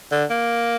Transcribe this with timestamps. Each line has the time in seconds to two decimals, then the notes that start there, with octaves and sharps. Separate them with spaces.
0.12 D3
0.30 A#3